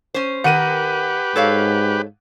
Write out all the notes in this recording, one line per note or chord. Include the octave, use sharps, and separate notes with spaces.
C#4 C5
D#3 G4 A#4 B4 F#5 D#7
G#2 A4 C#5 F5